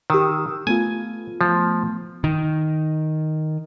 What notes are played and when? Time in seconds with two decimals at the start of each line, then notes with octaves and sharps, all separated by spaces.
0.10 D#3 G4 D#6 E6
0.67 A3 B3 F4 G#5
1.41 F3
2.24 D#3